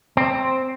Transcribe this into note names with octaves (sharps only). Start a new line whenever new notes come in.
C4